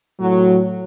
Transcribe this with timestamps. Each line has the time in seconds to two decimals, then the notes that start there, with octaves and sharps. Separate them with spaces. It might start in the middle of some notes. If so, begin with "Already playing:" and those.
0.20 A2 F#3